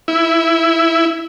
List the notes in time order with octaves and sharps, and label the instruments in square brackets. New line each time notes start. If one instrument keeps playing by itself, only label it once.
[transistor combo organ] E4